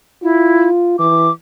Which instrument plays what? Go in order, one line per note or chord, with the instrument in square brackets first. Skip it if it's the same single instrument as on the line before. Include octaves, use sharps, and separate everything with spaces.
[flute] E4 [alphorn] F4
[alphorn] E3 [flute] D6